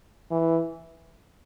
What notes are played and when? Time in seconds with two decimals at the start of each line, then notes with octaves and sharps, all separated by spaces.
0.31 E3